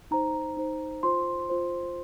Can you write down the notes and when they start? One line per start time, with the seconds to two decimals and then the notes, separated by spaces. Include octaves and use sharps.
0.11 D#4 C5 A#5
0.57 D#4 C5
1.03 F4 C5 C6
1.50 F4 C5